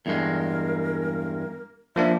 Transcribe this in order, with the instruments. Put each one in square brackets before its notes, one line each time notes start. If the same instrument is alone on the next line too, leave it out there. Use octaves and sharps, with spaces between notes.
[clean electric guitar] E2 G2 G#3 [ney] A#4
[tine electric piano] F3 A#3 D4 [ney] E5